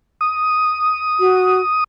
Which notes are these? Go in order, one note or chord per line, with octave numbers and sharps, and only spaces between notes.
D#6
F#4